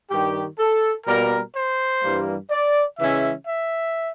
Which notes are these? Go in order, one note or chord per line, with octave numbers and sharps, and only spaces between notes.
G2 D#3 G3 G4
A4
B2 G3 A#3 A#4
C5
G2 E3 G3 A#3
D5
C#3 E3 G#3 C#4 E5
E5